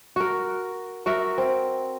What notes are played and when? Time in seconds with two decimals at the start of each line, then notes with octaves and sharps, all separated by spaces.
0.16 F#4 A#4
1.06 F#4 A#4 E5
1.38 C4